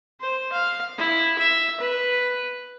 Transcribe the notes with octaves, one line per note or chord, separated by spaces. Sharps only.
C5
F5
E4
E5
B4